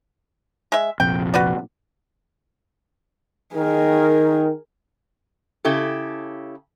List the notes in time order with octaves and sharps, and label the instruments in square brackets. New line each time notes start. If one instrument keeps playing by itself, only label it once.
[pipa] G#3 E5
[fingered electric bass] F1 A#1 F2 [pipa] G5
[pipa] F#4 B4 D5
[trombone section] D#3 [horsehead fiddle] G#4 A#4
[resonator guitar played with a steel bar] C#3 E4 G4 A4